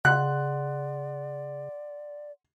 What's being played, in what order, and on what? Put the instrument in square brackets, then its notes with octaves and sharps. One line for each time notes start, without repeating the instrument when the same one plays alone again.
[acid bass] C#3 [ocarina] D5 [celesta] F#5 C6 [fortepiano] F#6